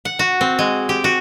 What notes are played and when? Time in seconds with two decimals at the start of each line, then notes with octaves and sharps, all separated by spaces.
0.05 F#5
0.19 F#4
0.41 C4
0.59 G#3
0.89 G4
1.04 F#4